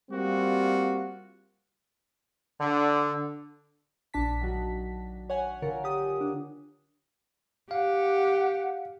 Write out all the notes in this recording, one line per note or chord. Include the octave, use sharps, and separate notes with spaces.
G3 A#3 C4 F4 F#4
D3
A#1 D4 A5 B6
D#3 F#3 F#4
C#5 F#5 G#5
D3 F4 A#4 C#5
G4 D#6
D4
G4 F5 F#5